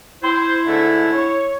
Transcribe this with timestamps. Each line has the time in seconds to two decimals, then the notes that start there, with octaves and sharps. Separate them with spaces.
0.23 E4 C5
0.66 G#2 D3 A3
1.12 C#5